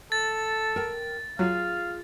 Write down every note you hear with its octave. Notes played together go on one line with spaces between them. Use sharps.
A4 A6
A#4 G5
F#3 F4 G#4 F5